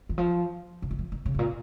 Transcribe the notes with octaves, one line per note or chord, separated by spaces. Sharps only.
D#3
F3
C#3
D#3
F3
D#3
C#3
G#2
A#2